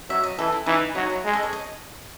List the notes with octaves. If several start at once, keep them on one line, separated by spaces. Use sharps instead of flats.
F#3 E5
D#5
E3 A4
E4
E3 D#4
F#3 D#4
E4
G#3
A4
C#5
D#5